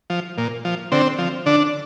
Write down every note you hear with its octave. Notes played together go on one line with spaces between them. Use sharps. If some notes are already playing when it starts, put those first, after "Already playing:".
F3
A#2
F3
D3 C4
F3
D3 D4